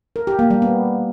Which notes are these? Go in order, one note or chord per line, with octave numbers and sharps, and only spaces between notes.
A#4
G4
A#3
G3
B3